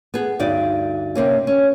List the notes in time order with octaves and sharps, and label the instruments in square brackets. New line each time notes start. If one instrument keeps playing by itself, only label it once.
[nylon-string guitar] B3 G#4
D2 G2 D#4 D5
C3 A#3 C#4
C#4